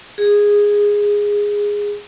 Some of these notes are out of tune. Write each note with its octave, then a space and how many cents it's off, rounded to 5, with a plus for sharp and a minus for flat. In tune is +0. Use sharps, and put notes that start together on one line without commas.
G#4 -10